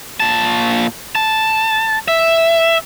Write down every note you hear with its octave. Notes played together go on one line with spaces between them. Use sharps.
A#2 A5
A5
E5